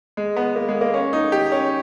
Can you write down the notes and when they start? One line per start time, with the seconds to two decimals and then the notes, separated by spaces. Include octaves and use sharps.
0.17 G#3
0.36 B3
0.56 A#3
0.69 G#3
0.81 A#3
0.94 C#4
1.13 D#4
1.32 G4
1.52 C#4